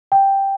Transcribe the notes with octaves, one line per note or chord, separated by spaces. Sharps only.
G5